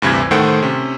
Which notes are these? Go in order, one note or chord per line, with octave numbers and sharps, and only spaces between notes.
D2 G2 C3 E3 G#6
A2 D#3 A3 C5 F#5 G5
C3 C#4